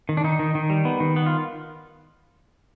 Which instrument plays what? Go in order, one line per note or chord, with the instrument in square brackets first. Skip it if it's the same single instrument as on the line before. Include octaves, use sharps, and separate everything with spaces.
[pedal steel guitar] D#3
D4
D#3 D#4
D#3
D#3
G3
B3
D#3
B3
F4